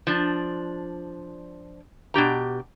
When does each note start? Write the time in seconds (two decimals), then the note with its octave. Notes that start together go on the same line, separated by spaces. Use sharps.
0.07 F3 D4
2.14 B2 D4 G4 A#5